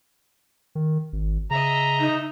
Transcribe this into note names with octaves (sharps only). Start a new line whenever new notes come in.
D#3
G#1
C#3 D#5 E5 A#5
D#4